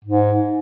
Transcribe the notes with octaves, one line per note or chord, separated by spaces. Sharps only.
G#2